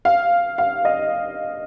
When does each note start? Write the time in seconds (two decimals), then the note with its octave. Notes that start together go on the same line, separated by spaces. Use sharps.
0.05 F5
0.58 F5
0.85 D#5